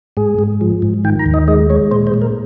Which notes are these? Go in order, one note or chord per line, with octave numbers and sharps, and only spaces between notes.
G#2 G#4
G#2
F3
G#2
D#3 G5
A#5
D#2
D#5
G#3 D#5
G#3 C#5
A#2 C5
C5
A#2
A#4